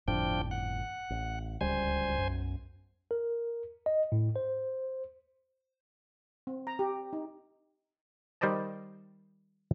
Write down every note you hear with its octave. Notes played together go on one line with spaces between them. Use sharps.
G1 F2 A2 F3 D4 G5
F#5
A1
D1 C#2 G3 C5 G#5
B1 F#2
A#4
D#5
A2
C5
C4
A#5
G4
D#4
D#3 G3 C5 D5 D#5 A5